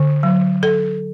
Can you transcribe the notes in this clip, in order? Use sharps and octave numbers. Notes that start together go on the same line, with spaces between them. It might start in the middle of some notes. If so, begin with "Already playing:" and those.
Already playing: D3
F#3
A4